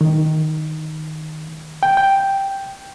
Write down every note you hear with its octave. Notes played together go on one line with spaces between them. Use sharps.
D#3
G5
G5